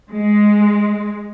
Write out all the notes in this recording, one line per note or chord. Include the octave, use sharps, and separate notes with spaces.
G#3